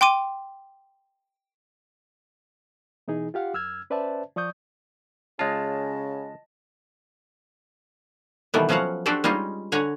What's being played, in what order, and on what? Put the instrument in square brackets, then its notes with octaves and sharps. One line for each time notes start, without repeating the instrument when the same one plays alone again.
[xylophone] G5 C6 D6 D#7
[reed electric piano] B2 E3 D#4 G#4
F4 G4 F5 F#5
F#2 E6 F6 G#6
C#4 B4 C5 D5 E5 A5
F3 D5 C#6 D#6 G6
[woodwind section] C#3 [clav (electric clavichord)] G#3 F4 [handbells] D#5 A5
[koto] B2 D#3 E3 G3 A3 B3
F3 F#3 C#4 F#4 F5 F#5
D4 F#4 G4 A4 C5 D5
G3 G#3 C#4 D#4 F4
D3 C#5 F#5 G#5 A#5